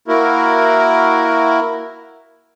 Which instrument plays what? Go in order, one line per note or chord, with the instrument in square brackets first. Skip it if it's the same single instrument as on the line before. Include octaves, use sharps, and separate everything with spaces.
[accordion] A#3 E4 F#4 A#4